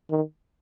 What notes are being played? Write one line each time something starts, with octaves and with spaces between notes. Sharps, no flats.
D#3